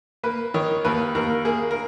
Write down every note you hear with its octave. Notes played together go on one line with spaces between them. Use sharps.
A#3 B4
D#3 C#5
D#2 B4
D#2 A#4
A#3 G#4
A#4